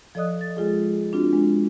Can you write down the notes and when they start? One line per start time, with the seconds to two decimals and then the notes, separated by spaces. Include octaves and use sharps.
0.15 F3 A4 D5 D#5 D#6 F#6
0.41 A6
0.57 G#3 F4 G#4
1.12 C4 D4 F4 F#4
1.33 G#3